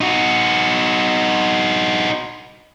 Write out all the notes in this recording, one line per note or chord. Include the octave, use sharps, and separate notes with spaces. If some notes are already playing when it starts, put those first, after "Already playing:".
D#4 F#4